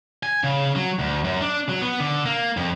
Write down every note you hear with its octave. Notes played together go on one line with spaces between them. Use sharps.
G#5
C#3
F#3
D2
F#2
D4
F#3
B3
D3
A#3
F2